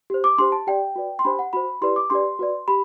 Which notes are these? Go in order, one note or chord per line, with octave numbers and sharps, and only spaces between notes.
G4 C5
D6
D4 G4 C5 C6
A5
G4 D5 G5
F#4 B4 D5
C6
D4 G4 C5 B5
F#5
F#4 C5 B5
E4 G4 B4 D5 C6
D6
D4 G4 B4 D5 C6
F#4 B4 D5
G4 B5